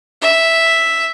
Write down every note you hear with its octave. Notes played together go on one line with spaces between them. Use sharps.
E5